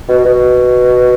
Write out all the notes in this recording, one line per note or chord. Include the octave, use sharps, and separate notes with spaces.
B2
B2